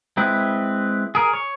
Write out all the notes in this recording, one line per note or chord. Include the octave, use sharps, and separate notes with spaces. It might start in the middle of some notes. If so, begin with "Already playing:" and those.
G#3 C4 E4 B4
G#4 A#4
C#5